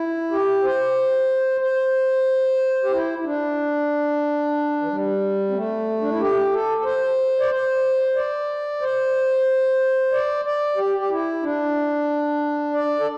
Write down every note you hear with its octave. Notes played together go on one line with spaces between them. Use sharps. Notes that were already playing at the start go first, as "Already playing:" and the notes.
Already playing: E4
G4
C5
C5
G4
E4
E4
D4
E3
G3
C4
A3
D4
E4
G4
A4
A4
C5
D5
C5
D5
C5
D5
D5
G4
G4
E4
D4
D5
A4